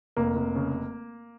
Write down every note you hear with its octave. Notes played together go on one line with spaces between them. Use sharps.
F1 A#3
F1
C#3